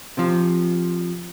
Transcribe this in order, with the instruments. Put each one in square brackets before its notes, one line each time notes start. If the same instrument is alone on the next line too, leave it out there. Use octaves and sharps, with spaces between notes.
[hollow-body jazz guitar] C3 F3